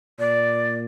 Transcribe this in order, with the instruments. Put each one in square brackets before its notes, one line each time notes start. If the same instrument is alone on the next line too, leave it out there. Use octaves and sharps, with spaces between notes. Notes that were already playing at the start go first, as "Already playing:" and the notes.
[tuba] A#2 [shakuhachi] D5